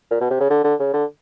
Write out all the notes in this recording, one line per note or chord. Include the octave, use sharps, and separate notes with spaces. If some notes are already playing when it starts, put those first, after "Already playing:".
A#2
B2
C3
C#3
D3
D3
C#3
D3